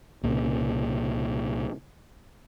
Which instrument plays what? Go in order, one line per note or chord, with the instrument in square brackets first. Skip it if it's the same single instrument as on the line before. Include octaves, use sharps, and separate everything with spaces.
[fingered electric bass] C2 A#2 C#3